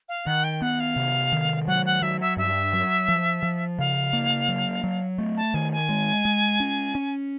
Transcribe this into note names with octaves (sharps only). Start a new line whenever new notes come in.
F5
D#3 F#5
G5
B3 F#5
F5
C3
D#3
F#3 F#5
F#5
F#3 E5
E5
G2 E5
F#3
F3
F3
C#3 F5
A#3
F#3
F#3
A3
A5
D#3 G#5
G#5
G#3
G#3
C#4
C#4